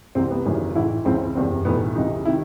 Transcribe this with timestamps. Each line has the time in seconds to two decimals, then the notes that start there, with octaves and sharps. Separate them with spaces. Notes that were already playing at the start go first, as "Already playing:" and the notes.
0.15 C2 C3 E3 C4
0.31 B3
0.45 G#1 F#2 C#3 E3
0.75 A1 G#2 E3 E4
1.05 C#2 C#3 E3 C4
1.35 F#1 E2 C3 C4
1.65 B1 A2 E3 B3
1.95 C#2 C3 E3 D#4
2.25 C3 D#3 E4